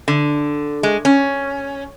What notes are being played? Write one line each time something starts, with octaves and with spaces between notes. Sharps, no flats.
D3
G#3
C#4